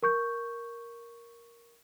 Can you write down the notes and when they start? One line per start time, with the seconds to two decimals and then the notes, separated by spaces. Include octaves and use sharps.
0.03 A#4 C#6 G6